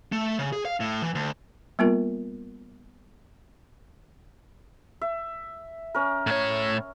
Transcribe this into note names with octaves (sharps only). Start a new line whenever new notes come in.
A3
C#3
G#4
F5
A2
E3
D2
G3 A#3 B3 F4 A#4
E5
C#4 A#4
A2 C#5